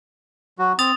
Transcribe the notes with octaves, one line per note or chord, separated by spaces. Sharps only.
F#3 F#4
C4 D#6 A6 F7